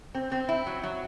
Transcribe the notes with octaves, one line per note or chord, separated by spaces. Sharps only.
C4
C4
E4
F#3
F#3